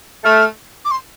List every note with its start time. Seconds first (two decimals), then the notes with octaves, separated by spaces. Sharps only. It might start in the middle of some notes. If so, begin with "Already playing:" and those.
0.24 A3 F6
0.85 D6
0.91 C6